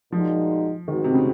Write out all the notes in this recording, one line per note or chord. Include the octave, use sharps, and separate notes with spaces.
A#2 F3 G#3 D#4 F#4
D#3 G#3 C4 F#4
C3
C#3